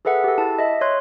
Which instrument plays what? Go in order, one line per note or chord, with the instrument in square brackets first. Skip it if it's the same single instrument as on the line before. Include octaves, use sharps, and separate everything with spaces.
[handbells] G#4 A4 B4 E5 F#5
G4 A4
E4 A5
D#5 E5
C#5 C6 F#6